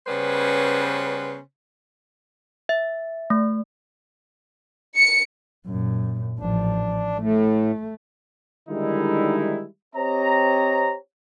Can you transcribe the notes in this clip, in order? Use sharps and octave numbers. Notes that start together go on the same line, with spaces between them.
C#3 G3 B3 C#4 B4 C5
E5
A3
C#7
F#2 A#2
A1 F3 D4
A2 A3
D3 D#3 G3 G#3 D#4 E4
C4 G4 C5 C#5 D#5 A#5